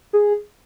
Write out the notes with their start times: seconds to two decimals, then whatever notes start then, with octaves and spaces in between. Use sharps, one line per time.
0.13 G#4